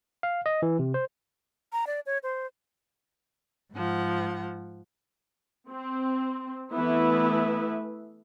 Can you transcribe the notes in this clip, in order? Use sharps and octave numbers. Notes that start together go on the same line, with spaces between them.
F5
D#5
E3
C3
C5
A#5
D5
C#5
C5
G#2 F3 F#5
C4
E3 A3 B3 E4 B4 E5